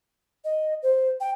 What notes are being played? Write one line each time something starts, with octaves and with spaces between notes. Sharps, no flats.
D#5
C5
G5